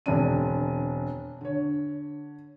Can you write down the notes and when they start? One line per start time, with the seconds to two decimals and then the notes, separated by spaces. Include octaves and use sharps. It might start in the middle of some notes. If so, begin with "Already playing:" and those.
0.06 E1 D3 C4 D4 D#7
1.41 D3 C#5